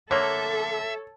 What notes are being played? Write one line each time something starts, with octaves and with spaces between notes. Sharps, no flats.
D3 A#3 A4 C#5 E5